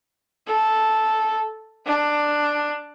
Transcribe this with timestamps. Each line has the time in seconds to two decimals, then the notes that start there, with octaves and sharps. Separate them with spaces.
0.47 A4
1.86 D4